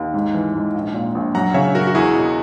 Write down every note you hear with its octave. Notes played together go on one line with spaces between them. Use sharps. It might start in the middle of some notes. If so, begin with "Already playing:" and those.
Already playing: D#2
G#2
E3
G#2
A#1
A#2
A#1
F#2 F#5 A#5
C#3 C#5 E5
F#2 F#4 A#4
F#4
E2 E4 G#4
B2